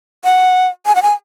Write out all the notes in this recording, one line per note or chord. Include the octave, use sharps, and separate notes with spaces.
F#5
G#5
F#5
G#5